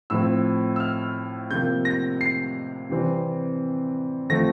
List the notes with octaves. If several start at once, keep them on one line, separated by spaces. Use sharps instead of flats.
A2 F3 C4 E6
E6
F6
C3 F3 A#3 G6
A#6
C7
C3 E3 G3 C4
D3 F3 A3 C4 A#6